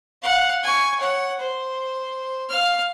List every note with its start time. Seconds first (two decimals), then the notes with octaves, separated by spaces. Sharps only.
0.22 F5 F#5
0.63 G#5 C#6
1.00 C#5 F#5
1.39 C5
2.49 F5 F6